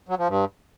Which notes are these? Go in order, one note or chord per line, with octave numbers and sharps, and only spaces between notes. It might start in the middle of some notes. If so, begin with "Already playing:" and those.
F#3
F3
G2